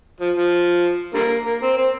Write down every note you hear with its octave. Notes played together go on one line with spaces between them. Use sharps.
F3
F3
D3 G3 A#3
A#3
C4
C4